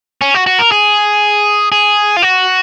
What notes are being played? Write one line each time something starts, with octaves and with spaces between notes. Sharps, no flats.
C#4
F#4
F#4
A#4
G#4
G#4
F4
F#4